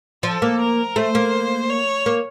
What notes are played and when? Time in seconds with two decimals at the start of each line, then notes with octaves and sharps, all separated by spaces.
0.23 F3 A4
0.42 A#3
0.60 A#4
0.96 A3 C5
1.15 A#3
1.70 C#5
2.06 A#3